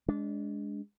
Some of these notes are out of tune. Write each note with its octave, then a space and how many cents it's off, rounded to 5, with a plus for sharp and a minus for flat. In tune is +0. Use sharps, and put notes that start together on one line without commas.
G#3 +0 D4 -25